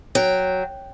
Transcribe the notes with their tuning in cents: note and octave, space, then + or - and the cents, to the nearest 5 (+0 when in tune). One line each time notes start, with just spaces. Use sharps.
F#3 +0 G5 +0